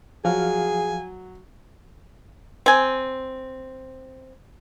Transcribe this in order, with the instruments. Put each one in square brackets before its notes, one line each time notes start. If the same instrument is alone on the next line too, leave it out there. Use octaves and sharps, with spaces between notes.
[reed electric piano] F3 F5 F6 [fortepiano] F#3 [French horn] G#4 [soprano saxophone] G#5
[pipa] C4 G#5